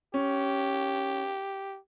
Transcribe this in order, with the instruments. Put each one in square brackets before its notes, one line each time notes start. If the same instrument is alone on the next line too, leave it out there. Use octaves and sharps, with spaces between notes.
[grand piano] C#4 [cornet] G4